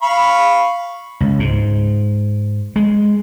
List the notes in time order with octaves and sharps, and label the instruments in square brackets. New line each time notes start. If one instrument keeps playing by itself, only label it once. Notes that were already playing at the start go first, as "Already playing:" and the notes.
[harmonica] F5 B5 C#6
[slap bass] C#2
G#2
G#3